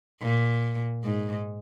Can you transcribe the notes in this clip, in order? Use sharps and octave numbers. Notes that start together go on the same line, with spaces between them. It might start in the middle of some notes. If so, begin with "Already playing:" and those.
A#2
G#2